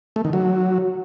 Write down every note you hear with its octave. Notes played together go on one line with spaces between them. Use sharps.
A3
D#3
F#3